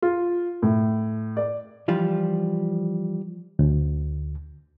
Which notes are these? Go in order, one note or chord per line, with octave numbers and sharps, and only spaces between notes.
F4
A2
D5
E3 F3 G3 F4
D2